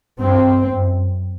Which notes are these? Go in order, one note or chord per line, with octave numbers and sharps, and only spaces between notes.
G2 C4
F#2